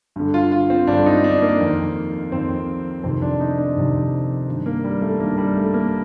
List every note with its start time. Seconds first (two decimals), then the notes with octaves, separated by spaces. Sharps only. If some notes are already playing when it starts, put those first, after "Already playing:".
0.16 G2 D3
0.34 F4
0.52 F4
0.70 C4
0.87 G2 D3 D4
1.06 D#4
1.24 D4
1.42 A#3
1.60 F2 D#3
2.32 F2 D#3 C4
3.03 F2 C3 D#3 C4
3.22 D4
3.40 D#4
3.58 D4
3.76 F2 C3 D#3
4.48 G2 D#3
4.66 A#3
4.84 G3
5.02 A3
5.20 G2 D#3 A#3
5.37 G3
5.56 A3
5.74 A#3